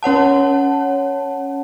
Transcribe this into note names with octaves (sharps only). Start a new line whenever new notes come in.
C#4 C#5 F#5 A5